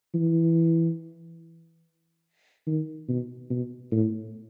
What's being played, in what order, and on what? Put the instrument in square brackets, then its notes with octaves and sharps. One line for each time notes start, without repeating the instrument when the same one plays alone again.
[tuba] E3
D#3
B2
B2
A2